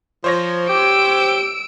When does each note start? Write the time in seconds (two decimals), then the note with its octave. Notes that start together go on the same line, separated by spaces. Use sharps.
0.24 F3 C5 C#5 A#6
0.69 G4 E6 D7